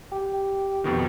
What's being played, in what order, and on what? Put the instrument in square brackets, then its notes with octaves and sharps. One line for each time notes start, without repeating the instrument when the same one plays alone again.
[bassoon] G4
[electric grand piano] F2 B2 D#3